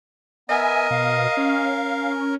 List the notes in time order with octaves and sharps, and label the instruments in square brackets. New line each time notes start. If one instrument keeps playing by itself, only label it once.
[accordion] B3 E5 G#5 [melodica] A#4 [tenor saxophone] D#5
[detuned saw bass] B2 [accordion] F5
[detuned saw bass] C#4